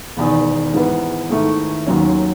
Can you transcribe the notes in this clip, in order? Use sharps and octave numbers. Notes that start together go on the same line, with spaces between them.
E1 E2 D#3
G#2 E3 B3
G#2 D#3 A3 E4
D#2 D#3 F#3 C#4